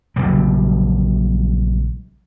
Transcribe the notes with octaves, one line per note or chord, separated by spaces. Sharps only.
A#1 C#3 F#3 G3